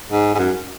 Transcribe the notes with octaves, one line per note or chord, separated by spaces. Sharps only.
G#2
G#2
F#2